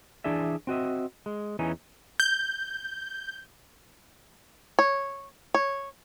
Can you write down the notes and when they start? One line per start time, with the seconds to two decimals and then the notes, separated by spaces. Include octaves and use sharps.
0.24 E3 D4 G#4 D5 E5
0.67 C4 F#4 D#5 E5
1.26 G#3
1.59 E2 E3 C#4 D#4
2.20 G6
4.79 C#5
5.54 C#5